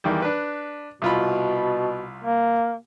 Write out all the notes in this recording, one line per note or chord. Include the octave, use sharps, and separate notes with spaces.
E2 D#3 G3
D4 B4
C2 B2 F4 B5
A#3